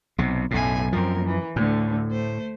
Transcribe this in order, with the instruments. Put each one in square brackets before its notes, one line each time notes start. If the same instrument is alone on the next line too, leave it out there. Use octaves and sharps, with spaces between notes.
[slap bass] B1 C3
[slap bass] B1 A2 [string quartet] F#2 A3 G#5
[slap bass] F#2 F3 [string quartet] C4 A#4
[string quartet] E3
[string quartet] D2 D3 [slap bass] A2
[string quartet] A3 C5